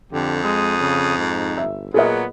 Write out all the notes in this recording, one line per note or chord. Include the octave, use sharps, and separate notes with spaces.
F2 D3 G4
G#3 D#6
C#3
G#2 D#4
G1 E5
A#2 F#3 B3 G#4 A#4 D#5